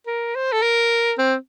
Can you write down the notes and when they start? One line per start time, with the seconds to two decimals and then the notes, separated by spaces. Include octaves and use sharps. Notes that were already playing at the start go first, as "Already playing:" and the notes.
0.07 A#4
0.35 C5
0.53 A4
0.62 A#4
1.18 C4